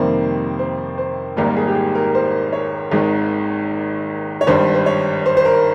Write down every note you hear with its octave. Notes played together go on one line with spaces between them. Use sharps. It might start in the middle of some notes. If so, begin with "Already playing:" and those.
Already playing: F2 C3 D#3 G3 A#3 C5
C5
C5
G#1 G#2 G3 A#3 A#4
G#4
G4
G#4
A#4
C5
C#5
G#1 G#2 D#3 G#3
C#5
G#1 G2 G3 C5
C5
C#5
C5
C5
A#4